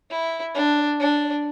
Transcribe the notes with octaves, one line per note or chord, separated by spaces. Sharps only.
E4
D4
D4